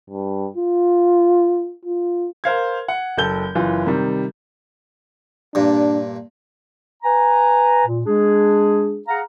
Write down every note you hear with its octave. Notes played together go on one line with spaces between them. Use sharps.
G2
F4
F4
A#4 C5 F5 G#6
F#5
F#1 A4 G6 G7
F#1 E3 F4
C3 D#3 G3
G2 A#2 D4
B4 G#5 A#5
A#2
G#3 D4 G#4
G#4 F5 F#5 A#5